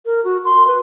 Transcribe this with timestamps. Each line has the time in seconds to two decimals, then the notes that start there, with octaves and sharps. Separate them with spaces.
0.06 A#4
0.24 F#4
0.45 C6
0.67 B4